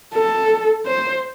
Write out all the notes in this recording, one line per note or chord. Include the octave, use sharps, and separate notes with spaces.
A4
C5